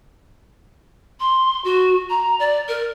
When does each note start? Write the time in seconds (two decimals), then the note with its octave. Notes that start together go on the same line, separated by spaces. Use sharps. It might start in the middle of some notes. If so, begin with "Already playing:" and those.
1.20 C6
1.64 F#4
2.09 A#5
2.39 D5
2.68 A#4